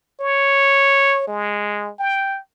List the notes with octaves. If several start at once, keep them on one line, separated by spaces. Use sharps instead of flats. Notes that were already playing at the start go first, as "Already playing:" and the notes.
C#5
G#3
G5